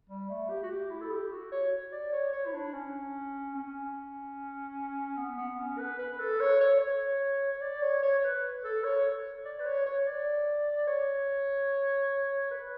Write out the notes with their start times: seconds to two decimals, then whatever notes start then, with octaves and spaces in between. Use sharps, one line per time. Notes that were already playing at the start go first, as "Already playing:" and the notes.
0.09 G3
0.29 A3
0.49 G4
0.63 F#4
0.70 G4
0.90 E4
1.01 A4
1.11 G4
1.31 F#4
1.52 C#5
1.92 D5
2.13 C#5
2.32 C#5
2.46 E4
2.53 D4
2.73 C#4
3.55 C#4
5.17 B3
5.38 B3
5.59 C#4
5.78 B4
5.99 B4
6.19 A4
6.40 C#5
6.61 C#5
6.80 C#5
7.52 C#5
7.61 D5
7.82 C#5
8.03 C#5
8.24 B4
8.64 A4
8.84 C#5
9.45 D5
9.60 B4
9.66 C#5
9.86 C#5
10.06 D5
10.87 C#5
12.51 B4